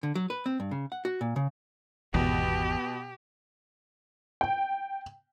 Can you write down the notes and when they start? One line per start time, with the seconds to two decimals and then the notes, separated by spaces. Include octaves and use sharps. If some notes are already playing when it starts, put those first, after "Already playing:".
0.03 D3
0.15 F#3
0.30 B4
0.46 C4
0.60 G2
0.71 C#3
0.92 F#5
1.05 F#4
1.21 A#2
1.36 C#3
2.14 G#1 E2 B2 G4
4.41 G5